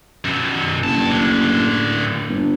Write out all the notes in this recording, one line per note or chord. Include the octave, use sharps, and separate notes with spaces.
F#2 B2
F#1 G2 A5
A2 D3
G1